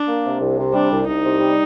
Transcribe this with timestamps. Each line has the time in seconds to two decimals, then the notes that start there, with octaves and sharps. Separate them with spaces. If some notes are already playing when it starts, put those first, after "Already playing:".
Already playing: D4
0.08 A#3
0.25 C3
0.41 C2
0.58 C3
0.73 G3 D4
0.90 C2
1.07 C2 D#4
1.24 C3
1.40 G3